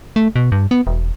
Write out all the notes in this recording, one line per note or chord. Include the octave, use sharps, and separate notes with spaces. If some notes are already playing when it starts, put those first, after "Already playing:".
A3
B2
G2
B3
E1